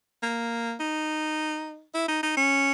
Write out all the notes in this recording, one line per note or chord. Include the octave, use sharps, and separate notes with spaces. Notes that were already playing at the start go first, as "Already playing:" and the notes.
A#3
D#4
E4
D#4
D#4
C#4